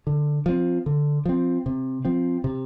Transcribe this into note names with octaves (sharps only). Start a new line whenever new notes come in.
D3
F3 C4
D3
F3 C4
C3
F3 C4
C3